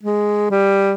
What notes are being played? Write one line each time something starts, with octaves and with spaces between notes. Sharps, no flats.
G#3
G3